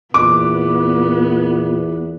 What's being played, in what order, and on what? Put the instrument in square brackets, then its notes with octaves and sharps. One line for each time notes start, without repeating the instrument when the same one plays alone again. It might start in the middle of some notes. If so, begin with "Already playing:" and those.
[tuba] E2 [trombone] A#2 [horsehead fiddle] B3 [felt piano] D6